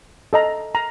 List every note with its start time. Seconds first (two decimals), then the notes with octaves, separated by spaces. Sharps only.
0.33 A4 D#5 A#5
0.75 A#5